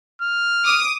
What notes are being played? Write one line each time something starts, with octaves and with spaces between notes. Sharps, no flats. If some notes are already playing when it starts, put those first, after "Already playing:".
F6
D6 D#6